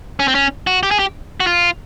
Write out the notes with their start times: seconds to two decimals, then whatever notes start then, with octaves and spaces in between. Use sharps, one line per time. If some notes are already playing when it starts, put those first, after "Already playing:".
0.20 C#4
0.28 C4
0.35 C#4
0.67 F#4
0.83 G4
0.91 G#4
0.99 G4
1.40 F#4
1.47 F4